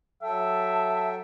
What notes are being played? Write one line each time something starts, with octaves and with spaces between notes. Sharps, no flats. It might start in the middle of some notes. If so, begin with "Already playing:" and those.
F#3 A4 E5 G5 A5